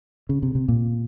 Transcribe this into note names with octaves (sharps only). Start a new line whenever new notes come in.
C#3
C3
C3
A#2